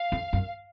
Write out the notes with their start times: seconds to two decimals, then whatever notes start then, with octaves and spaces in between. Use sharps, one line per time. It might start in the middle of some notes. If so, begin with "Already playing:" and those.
Already playing: F5
0.12 F2
0.33 F#2